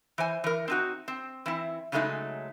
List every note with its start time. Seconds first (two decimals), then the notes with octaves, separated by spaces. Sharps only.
0.18 E3 C5 G#5
0.44 E3 A#4
0.68 C4 D#4 F#4
1.08 C4
1.46 E3 C4 E4
1.92 C#3 F#3 G#3 A3 B3 D#4